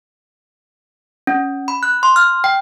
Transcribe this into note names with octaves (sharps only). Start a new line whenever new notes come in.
C#4
B5
F#6
C6
F6
G5